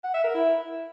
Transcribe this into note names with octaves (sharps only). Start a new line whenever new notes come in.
F#5
E5
A#4
E4